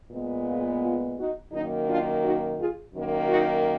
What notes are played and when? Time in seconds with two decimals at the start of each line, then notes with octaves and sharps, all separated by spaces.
0.11 A#2 G#3 B3
0.47 F4 G#4
0.83 F4 G#4
1.18 D#4 F#4
1.52 F#2 D#3 A#3 D#4
1.88 D4 F4
2.23 D#4 F#4
2.59 F4 G#4
2.95 F#2 D#3 A#3
3.29 D#4 F#4